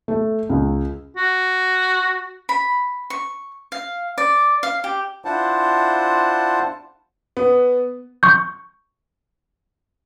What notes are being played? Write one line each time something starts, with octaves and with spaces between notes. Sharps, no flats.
A3
C#2
F#4
B5
C#6
F5
D5
F5
G4
D4 E4 F4 C5 F#5 A5
B3
C#6 G6